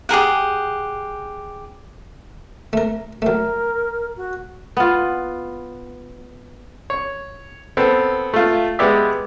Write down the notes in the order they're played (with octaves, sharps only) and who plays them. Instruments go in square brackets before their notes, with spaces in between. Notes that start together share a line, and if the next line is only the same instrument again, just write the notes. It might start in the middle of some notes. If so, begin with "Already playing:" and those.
[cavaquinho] G4 G#4 A#4 F#5
[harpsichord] A3 A#4
[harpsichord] F#3 A3 [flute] A#4
[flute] F#4
[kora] B3 F4
[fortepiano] C#5
B3 C4 A4
A3 F4
G#3 B3 G4 D5 E5